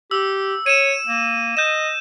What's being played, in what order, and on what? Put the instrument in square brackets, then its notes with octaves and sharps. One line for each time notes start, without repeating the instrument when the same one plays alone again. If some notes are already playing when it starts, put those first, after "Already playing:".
[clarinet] G4 [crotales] E6
[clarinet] C#5 [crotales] D#7 E7
[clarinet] A#3
[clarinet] D#5 [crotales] G6 E7